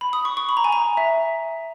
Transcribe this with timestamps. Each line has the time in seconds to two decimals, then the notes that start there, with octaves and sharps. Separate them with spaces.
0.01 B5
0.13 D#6
0.25 C#6
0.37 C#6
0.49 B5
0.57 A#5
0.64 G#5
0.72 A#5
0.97 E5